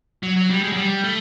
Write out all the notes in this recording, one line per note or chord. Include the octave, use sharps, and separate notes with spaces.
F#3
F#3
G3
G#3
F#3
G3
A3